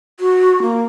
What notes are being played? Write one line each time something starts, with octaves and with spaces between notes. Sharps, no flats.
F#4
A#3